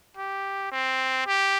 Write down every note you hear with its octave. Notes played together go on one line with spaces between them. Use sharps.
G4
C4
G4